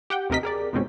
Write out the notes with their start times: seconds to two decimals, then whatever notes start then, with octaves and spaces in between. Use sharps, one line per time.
0.10 G4 F#5 G5
0.30 D#2 C3 A3 A#4 D#5 B6
0.43 G#4 A#4 D5
0.73 F2 G#2 B2 C4 C#4